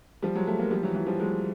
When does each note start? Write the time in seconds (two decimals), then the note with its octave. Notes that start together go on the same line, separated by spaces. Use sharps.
0.22 F3 G3
0.35 F#3 G#3
0.47 G3 A3
0.59 G#3 A#3
0.71 F3 G3
0.83 E3 F#3
0.95 E3 F#3
1.07 F3 G3
1.20 F#3 G#3